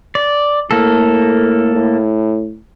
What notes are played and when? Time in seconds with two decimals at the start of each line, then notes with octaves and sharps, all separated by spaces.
0.15 D5
0.71 A2 A#3 A4
1.75 A2